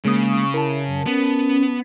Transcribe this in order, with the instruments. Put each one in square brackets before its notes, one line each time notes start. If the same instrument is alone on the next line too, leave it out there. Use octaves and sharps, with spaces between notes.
[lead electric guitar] C#3 [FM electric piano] G#3 A#3 D#6
[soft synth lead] C#6
[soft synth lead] E4 [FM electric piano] A#4 A5
[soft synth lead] F#2
[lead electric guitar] B3 [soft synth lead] C#4